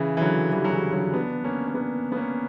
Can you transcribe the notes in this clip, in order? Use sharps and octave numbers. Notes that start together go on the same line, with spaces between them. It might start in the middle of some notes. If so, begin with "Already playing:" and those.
Already playing: C#3 E3
E3
D3 F#3
E3 G3
F#3
C#3 E3
D3 F#3
B3 D4
A#3 C#4
C#4
B3 D4
B3
A#3 C#4